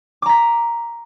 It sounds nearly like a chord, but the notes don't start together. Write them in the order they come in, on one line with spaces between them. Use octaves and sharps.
D6 A#5 B6